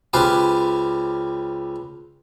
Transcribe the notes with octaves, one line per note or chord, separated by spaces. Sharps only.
C#2 C#4 G4 B4 C5 A5